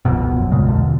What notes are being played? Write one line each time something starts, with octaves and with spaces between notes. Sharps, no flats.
D#1 C2 F2 B2
F#2
C2 A#2 C#3 G#3
E2 B2 D3 F3